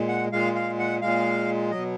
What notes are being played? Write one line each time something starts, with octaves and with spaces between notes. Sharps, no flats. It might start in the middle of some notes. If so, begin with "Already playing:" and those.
Already playing: A#2 G#3
F#5
A#2 G#3 F5
F5
F#5
A#2 G#3 F5
B2 F#3 D#5